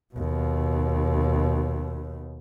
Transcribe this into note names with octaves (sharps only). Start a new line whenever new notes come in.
D#2 B2